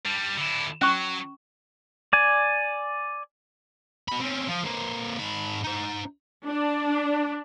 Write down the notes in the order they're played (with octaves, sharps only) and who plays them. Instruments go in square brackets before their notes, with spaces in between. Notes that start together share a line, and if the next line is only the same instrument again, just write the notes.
[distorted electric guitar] G3 D4
D3 E4
[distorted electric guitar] F#3 [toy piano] C#4 C#6
[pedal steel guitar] D5 G#5
[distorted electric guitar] B2 B5
C4 C#4
F3
A#3 C4
G#2 B5
D#4 C5
[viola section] D4